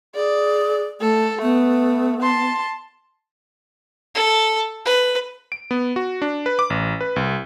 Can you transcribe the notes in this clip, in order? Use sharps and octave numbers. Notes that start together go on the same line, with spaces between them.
G#4 D5
A3 A4
A3 B3
A5 C6
A4
B4
D7
B3
F#4
D4
B4
D6
A1
B4
C2